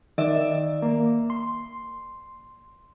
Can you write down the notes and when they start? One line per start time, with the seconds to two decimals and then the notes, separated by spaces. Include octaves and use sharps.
0.18 D#3 D5 E5
0.82 A#3
1.30 C6